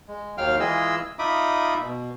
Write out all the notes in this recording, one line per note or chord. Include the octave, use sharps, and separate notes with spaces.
G#3
D#2 F#3 F5 G5 F6
E3 G#3 F4 G#4 D#5 E6
D#4 F4 E5 B5 D6 D#6
B2